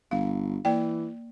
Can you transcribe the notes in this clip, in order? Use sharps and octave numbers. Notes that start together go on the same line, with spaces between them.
G1 F5
E3 A#3 D5 G5